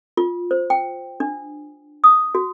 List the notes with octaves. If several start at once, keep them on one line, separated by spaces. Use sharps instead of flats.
F4
C5
G5
D4
D#6
F#4